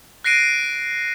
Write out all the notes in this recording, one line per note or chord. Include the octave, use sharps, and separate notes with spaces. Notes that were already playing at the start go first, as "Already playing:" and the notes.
F#6 A#6 C7 D7 D#7